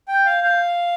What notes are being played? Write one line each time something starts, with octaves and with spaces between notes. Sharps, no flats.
G5
G6
F5
F5